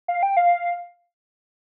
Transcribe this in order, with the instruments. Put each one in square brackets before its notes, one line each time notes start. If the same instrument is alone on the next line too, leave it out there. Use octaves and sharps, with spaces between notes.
[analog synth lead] F5
G5
F5